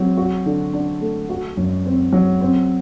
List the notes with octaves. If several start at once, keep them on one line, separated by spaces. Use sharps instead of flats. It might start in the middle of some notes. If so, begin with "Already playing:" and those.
Already playing: F#3 C4
F#4
D3
D4
A3
F#4
F#2
C4
F#3
C4